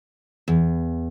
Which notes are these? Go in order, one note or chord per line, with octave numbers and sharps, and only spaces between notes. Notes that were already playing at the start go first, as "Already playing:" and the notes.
E2